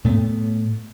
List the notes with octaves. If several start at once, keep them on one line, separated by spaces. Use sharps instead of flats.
A2 A3 B3